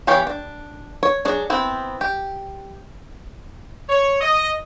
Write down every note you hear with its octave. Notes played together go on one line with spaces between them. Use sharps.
E3 B3 G4 C#5 F5
D4
C#5
F#3 D4 G#4
B3 C4 E4
G4
C#5
D#5